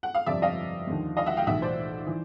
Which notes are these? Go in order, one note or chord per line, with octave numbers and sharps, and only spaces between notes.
F#5
F5
G1 F2 C3 F3 D5 E5
D#5 F5
D#2 D3 F3
D#5 F5
E5 F#5
F5 G5
B1 A2 E3 E5 F#5
C5 D5
E3